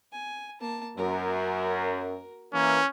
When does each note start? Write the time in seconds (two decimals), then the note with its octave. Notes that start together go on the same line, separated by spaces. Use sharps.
0.12 G#5
0.61 A#3 A5
0.97 F#2 F#4 A#4
2.53 E3 A#3 C#4